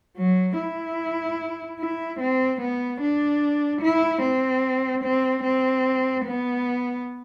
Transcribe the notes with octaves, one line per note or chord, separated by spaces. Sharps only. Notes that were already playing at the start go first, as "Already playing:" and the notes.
F#3
E4
E4
C4
B3
D4
E4
C4
C4
C4
B3